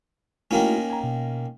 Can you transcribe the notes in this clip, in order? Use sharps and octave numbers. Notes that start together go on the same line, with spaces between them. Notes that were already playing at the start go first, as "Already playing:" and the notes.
D#3 A3 A#3 C#4 E4 F#4
G#5 A#5
B2